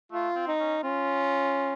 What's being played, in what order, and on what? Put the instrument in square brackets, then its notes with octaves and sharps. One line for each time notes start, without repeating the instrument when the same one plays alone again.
[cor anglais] A3 [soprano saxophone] F4
[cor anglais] C4
[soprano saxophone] D#4
[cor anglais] C#4
[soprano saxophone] C#4 [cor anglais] F4